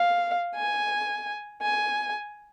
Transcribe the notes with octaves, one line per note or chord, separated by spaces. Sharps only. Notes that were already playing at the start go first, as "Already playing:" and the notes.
Already playing: F5
G#5
G#5